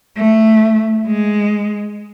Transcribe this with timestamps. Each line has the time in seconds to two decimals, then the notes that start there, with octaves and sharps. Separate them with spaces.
0.17 A3
1.07 G#3